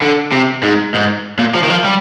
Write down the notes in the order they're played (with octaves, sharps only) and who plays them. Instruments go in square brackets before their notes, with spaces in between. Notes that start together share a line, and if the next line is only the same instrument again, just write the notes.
[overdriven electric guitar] D3
C3
G#2
G#2
A#2
F3
D#3
F3
G3